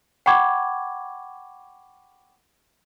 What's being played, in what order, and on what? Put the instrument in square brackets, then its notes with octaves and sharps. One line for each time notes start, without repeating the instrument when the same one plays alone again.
[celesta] F#5 G5 B5 C#6 D6 G#6